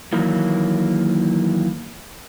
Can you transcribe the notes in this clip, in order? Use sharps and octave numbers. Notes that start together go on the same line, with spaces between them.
D#3 E3 F#3 A#3